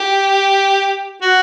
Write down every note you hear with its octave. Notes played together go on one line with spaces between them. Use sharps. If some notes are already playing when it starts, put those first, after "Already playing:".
Already playing: G4
F#4